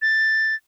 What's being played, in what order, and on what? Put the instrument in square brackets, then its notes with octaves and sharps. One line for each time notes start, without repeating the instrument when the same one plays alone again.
[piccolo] A6